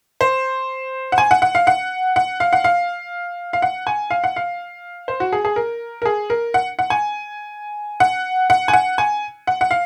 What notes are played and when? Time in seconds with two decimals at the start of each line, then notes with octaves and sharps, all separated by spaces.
0.21 C5
1.12 F#5
1.18 G#5
1.31 F#5
1.42 F#5
1.55 F5
1.67 F#5
2.16 F#5
2.40 F5
2.53 F#5
2.64 F5
3.53 F5
3.62 F#5
3.87 G#5
4.10 F5
4.24 F#5
4.36 F5
5.08 C5
5.20 F#4
5.33 G#4
5.45 G#4
5.56 A#4
6.02 A#4
6.05 G#4
6.30 A#4
6.54 F#5
6.79 F#5
6.90 G#5
8.00 F#5
8.50 F#5
8.68 G#5
8.73 F#5
8.98 G#5
9.47 F#5
9.61 F#5
9.71 F5